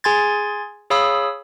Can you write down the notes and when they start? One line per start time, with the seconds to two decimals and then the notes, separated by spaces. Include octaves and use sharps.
0.04 G#4 G#5 C6 G#6 A6
0.90 G#4 C#5 F5 B5 D#6 E6